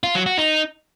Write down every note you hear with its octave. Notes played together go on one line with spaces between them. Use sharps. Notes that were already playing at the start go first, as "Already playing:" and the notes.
F4
F#3
F#4
D#4